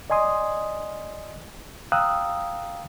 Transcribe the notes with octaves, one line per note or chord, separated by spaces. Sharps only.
D5 D#5 G#5 C6 D#6
F5 G5 A#5 D#6 E6 F#6